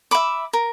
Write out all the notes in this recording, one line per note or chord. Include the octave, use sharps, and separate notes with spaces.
E5 B5 D6
A#4